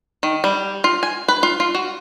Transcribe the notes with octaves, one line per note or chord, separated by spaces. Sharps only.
D#3
G3
F4
G#5
B4
F4
F4
F#4